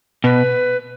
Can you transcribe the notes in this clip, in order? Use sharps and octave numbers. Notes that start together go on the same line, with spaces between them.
B2 B4